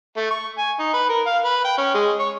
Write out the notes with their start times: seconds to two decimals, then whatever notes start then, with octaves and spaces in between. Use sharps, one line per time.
0.17 A3
0.31 C#6
0.58 G#5
0.79 D#4
0.94 B4
1.09 A#4
1.27 F5
1.45 B4
1.65 G5
1.78 C#4
1.94 G#3
2.19 C#5